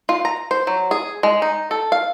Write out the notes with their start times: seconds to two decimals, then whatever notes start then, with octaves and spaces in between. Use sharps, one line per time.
0.09 F4
0.25 A#5
0.51 C5
0.67 F#3
0.91 G#4
1.23 G#3
1.42 D#4
1.71 A4
1.92 F5